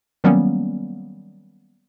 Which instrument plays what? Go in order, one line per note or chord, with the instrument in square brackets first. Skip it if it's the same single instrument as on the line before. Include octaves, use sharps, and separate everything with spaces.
[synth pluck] D#3 F#3 G3 A#3 B3 C#4